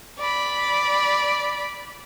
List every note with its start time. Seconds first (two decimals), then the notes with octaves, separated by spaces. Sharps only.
0.21 D5 B5